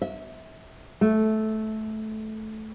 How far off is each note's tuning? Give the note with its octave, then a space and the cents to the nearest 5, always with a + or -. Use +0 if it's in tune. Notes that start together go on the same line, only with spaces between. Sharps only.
E5 -30
A3 -15